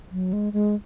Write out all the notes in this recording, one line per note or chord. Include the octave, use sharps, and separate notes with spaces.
F#3
G#3
G#3